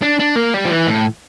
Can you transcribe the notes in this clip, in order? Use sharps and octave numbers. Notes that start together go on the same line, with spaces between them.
D4
D4
A#3
G3
F3
E3
A2